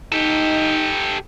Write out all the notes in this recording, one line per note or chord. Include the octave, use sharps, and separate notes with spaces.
D#4 G4 A4